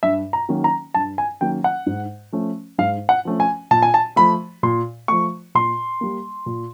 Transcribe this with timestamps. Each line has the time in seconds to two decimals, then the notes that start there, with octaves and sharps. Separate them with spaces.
0.03 G2 E5
0.33 A#5
0.49 D#3 F#3 A#3 C#4
0.64 A#5
0.94 G2 A5
1.18 G#5
1.41 D#3 F#3 A#3 C#4 G5
1.64 F#5
1.86 G#2
2.32 F3 A3 C#4
2.78 G#2 F5
3.09 F#5
3.25 F3 A3 C#4
3.40 G#5
3.71 A#2 A5
3.82 G#5
3.94 A5
4.16 F3 A3 B5
4.63 A#2 C6
5.08 F3 A3 C#6
5.55 A#2 C6
6.01 G3 A#3
6.46 A#2